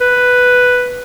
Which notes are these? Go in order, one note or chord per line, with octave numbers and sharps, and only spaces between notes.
B4